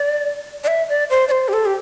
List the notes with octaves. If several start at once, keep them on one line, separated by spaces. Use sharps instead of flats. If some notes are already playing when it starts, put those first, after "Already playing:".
Already playing: D5
D5
E5
D5
C5
D5
C5
G4
A4
G4